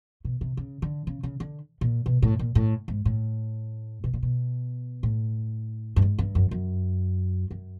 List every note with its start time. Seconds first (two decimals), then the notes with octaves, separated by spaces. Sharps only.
0.25 B2
0.41 C3
0.57 C#3
0.82 D3
1.07 C#3
1.23 C#3
1.40 D3
1.81 A#2
2.06 B2
2.22 A2
2.39 A#2
2.55 A2
2.88 G#2
3.05 A2
4.04 B2
4.14 A#2
4.22 B2
5.03 A2
5.96 G2
6.02 G#2
6.19 G2
6.35 F#2
6.51 F#2
7.51 F#2